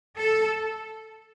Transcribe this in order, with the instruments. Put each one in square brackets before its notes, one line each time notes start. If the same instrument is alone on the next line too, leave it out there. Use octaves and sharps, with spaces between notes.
[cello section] A4